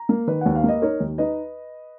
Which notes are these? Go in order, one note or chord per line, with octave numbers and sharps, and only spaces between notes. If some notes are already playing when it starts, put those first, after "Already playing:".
Already playing: A#5
A#3
D#3 B4
D#2 F#5
F5
A#3 D#5
D#4 A#4 C#5
D#2
D#4 B4 D#5